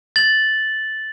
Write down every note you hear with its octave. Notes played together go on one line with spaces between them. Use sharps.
A6 F#7